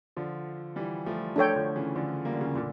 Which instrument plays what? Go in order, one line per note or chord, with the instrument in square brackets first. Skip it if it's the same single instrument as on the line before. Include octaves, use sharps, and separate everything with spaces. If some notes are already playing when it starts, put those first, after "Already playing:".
[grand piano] D3 F3
E3 G3
F3 A3
[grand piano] F3 A3 [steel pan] D4 A4 C#5 G5
[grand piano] D3 F3
C#3 E3
D3 F3
G3 A#3
D3
C#3 E3
A#2 D3